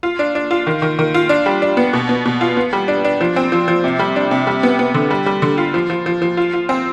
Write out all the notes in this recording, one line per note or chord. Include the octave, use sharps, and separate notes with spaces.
F4
D4
D4
F4
D#3
D#3
D#3
F4
D4
G3
D4
B3
B2
B3
B2
F4
B3
G3
D4
D4
F3
C4
F3
F3
C3
G3
D4
C3
G3
B3
B3
D3
G3
G3
D3
F4
F3
F3
F3
F3
F4
F4
C4